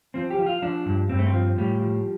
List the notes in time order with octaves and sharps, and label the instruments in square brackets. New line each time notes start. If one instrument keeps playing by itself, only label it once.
[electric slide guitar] F3 C4
G4
F3
F4
F3 D4
G2
G2 C4
A3
C4
F3
A2 G3
F3